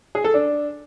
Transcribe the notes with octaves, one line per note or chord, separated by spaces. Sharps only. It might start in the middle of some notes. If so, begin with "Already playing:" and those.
G#4
A4
D4